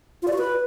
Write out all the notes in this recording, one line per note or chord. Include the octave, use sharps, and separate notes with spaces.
F4
D5
F#4
B4